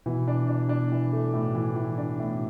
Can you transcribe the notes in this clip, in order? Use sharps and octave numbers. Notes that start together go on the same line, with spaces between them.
B2 E3
D4
D4
D4
E3
A3
A2
E3
E3
D4
A2